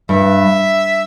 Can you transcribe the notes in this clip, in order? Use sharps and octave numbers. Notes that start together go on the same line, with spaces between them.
G2 E5